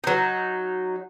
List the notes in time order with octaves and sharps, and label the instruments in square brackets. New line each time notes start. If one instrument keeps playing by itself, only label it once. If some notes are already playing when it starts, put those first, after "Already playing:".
[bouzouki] F#3 D#4